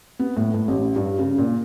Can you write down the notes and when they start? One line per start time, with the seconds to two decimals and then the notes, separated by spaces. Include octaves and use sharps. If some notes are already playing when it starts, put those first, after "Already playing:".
0.19 B3
0.37 A2
0.54 A2
0.68 A1
0.96 G2
1.19 C#3
1.38 A#2